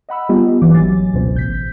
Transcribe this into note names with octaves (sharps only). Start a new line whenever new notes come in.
D#5 F#5 B5 E6
G3 B3 F4 G4 D#5
G1 E3 D6
A1 F#3 G#5 A6
G1 C#2 B2 C5
A1 G6 B6